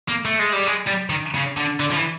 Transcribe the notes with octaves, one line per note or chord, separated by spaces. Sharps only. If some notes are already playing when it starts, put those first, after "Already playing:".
A#3
A3
G#3
G3
G#3
G3
D#3
C#3
D3
D3
F3
E3